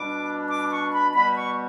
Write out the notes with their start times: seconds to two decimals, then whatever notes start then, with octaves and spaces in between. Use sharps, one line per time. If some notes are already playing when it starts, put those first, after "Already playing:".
Already playing: B2 G3 D4 D6
0.49 D6
0.71 C#6
0.93 B5
1.14 B2 G3 B3 B5
1.36 C#6